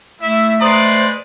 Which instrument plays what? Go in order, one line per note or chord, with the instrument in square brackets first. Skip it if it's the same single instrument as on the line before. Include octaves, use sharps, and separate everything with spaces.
[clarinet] A3 [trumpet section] E4 E5
[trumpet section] G#3 B4 D5 [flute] C5 [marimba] A#5 D#6